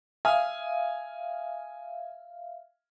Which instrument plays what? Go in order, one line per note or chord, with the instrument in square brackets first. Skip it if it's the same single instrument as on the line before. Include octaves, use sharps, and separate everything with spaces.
[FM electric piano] E5 F5 [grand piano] G#5 D#6 F6